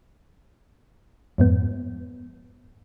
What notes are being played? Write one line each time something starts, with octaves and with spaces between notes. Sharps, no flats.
F2 G#2 B3